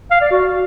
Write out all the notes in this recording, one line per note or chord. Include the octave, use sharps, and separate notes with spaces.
F5
D5
F#4